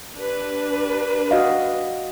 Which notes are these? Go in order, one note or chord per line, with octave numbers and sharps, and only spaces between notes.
D4 G4 B4
F#4 D#5 F5